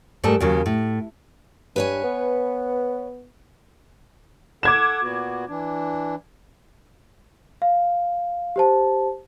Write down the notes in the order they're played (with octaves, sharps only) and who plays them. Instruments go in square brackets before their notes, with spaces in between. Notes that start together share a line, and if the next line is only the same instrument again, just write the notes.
[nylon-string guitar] G#2 G3 A3 A4 A#4
D#2 C#3 F#3
A2
[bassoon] G2 [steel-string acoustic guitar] B4 C#5 G#5
[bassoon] B3
[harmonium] A4 F#5 [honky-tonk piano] D6 G#6 E7
[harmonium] A#2 B3 F#4
E3 D4
[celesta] F5
G4 C5 A5